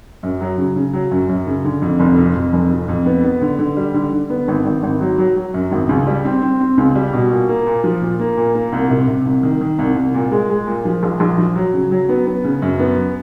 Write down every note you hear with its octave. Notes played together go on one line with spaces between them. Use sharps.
F#2
F#3
C#3
C#3
F#3
F#2
F#2
C#3
D3
F2
F1
F2
F2
F1
F2
F2
B3
B3
D3
D3
G3
D3
D3
B3
G#1
G#1
G#1
F#3
F#3
F#3
F#2
G#1
C#2
G3
C4
C4
C4
C#2
G3
B2
A#2
A#3
A#2
F3
A#2
A#3
A#2
A#3
C2
C3
C3
C2
D#3
D#3
C2
C2
A#2
G#3
G#3
A#2
F3
A#1
A#1
F3
F#3
C#3
F#3
B3
B3
C#3
F#2
B3